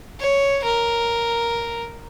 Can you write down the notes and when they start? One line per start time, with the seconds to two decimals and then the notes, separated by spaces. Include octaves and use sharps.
0.20 C#5
0.64 A#4